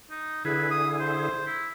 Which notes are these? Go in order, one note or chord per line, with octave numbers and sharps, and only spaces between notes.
D#4
D3 E4 G#4 B4
D#6
C5
E4